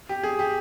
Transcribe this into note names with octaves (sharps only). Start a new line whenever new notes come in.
G4
G#4
G4